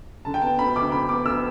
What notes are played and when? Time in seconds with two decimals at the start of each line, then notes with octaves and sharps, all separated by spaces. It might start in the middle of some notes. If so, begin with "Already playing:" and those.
0.25 D3 A5
0.34 G5
0.42 B3 A5
0.59 D2 B5
0.76 D2 D6
0.92 D3 B5
1.09 B3 D6
1.25 D2 E6